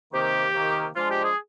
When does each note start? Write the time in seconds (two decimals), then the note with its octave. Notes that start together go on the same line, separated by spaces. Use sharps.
0.13 C3 D#3 A#3 G4
0.54 C3 D#3 A#3
0.96 F3 G#3 D4 F4
1.09 G4
1.24 G#4